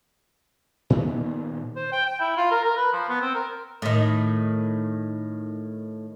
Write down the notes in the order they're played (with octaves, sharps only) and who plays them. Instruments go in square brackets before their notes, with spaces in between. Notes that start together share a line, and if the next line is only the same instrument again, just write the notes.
[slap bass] A#2 D#3 B3
[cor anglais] C5
G5
G5
E4
F4
A#4
A#4
B4
F3
B3
C4
A#4
[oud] A2 D#3